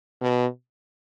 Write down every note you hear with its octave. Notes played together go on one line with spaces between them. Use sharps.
B2